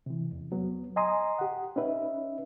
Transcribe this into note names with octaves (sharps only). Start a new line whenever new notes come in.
C3 E3
E2
F#3 B3
D#5 G#5 A#5 C6 D#6
G4 F#5
C#4 D#4 B4 E5